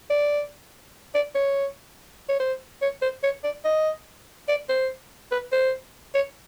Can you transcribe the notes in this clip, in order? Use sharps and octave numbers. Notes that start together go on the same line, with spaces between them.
D5
D5
C#5
C#5
C5
C#5
C5
C#5
D5
D#5
D5
C5
B4
C5
C#5